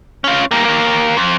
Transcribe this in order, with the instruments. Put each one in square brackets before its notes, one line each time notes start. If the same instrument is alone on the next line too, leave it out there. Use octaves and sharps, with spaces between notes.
[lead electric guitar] C#4 F4
G3 A#3
D#2 A#3
F2